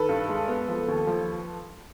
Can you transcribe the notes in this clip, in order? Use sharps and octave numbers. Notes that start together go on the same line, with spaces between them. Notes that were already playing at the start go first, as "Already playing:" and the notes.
Already playing: D#3 A4 B4
G2
G#3
B3
F3
D#2
F3